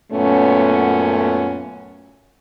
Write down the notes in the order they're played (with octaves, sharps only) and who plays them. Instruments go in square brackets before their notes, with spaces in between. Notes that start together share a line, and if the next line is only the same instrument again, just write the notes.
[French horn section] F#2 A#2 A3 B3 C#4